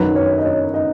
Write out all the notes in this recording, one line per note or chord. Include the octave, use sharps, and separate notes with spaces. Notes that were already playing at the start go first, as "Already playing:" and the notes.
Already playing: F#2 D#3 F#3 B4
C#5
D#5
C#5
D#5